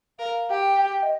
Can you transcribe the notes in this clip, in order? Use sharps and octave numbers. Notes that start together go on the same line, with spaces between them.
A#4 F5
G4 G5
G5
D#5